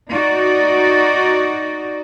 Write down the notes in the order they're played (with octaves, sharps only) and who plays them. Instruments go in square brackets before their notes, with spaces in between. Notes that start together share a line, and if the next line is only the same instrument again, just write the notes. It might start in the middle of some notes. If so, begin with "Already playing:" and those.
[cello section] D#4 F#4 D5